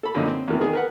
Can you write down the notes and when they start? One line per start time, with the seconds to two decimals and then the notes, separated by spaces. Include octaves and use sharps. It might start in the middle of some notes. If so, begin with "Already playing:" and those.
0.03 A4 B5
0.15 F#2 A#2 D3 F3 D#4
0.27 C4
0.48 E2 C3 D#3 E3
0.61 D#3 G#4
0.73 A#4 B4 F#5